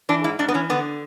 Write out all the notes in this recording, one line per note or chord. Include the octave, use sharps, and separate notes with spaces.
E3 D4
G#2 E4
G#2 D4
B3
E3 C#4
D3 B3